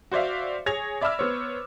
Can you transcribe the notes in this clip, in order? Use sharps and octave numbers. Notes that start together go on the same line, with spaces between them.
F#4 C5 D5 E5 F5
G#4 C#5 G#6 A#6 F7
D5 E5 B5 D6 E6 F6
B3 C5 C#5